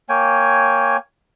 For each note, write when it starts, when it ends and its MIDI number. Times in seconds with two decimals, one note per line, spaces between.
0.09 0.97 58
0.09 0.97 73
0.09 0.97 79
0.09 0.97 80